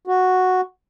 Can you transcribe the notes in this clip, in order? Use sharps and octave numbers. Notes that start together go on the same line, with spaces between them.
F#4